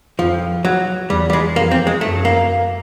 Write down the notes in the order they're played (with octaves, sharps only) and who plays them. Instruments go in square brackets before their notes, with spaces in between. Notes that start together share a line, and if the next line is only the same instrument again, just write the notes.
[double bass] F2 [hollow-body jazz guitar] F3
[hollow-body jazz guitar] F#3
[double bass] E2 [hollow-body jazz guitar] G3
[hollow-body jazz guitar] G3
G#3
[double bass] F2 [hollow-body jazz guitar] A#3
[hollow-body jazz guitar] C4
G#3
[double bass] F#2 [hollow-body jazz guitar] A3
[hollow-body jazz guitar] A#3